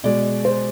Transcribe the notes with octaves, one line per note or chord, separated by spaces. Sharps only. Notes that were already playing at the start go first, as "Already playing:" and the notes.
B2 G#3 D5
C5